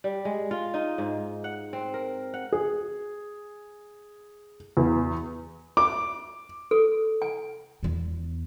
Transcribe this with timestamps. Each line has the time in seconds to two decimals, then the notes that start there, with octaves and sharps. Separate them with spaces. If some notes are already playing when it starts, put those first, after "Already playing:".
0.04 G3
0.25 G#3
0.51 F4
0.74 D#4
0.98 G#2
1.44 F#5
1.73 C4
1.94 A#4
2.34 F#5
2.53 G#4
4.77 E2
5.77 D6
6.71 A4
7.22 G#5
7.83 E2 B3